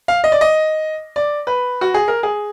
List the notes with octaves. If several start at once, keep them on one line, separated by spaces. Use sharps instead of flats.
F5
D#5
D5
D#5
D5
B4
F#4
G#4
A#4
G#4